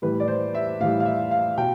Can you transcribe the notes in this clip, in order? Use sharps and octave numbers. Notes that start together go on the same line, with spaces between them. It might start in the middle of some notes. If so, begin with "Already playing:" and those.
A2 E3 G3 B4
D5
C5
E5
A2 E3 G3 F5
F5
E5
F5
B2 G5